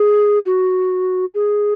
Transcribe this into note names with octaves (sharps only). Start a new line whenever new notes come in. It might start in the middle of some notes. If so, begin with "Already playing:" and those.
Already playing: G#4
F#4
G#4